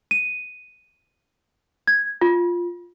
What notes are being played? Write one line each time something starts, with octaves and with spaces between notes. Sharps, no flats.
D#7
G#6
F4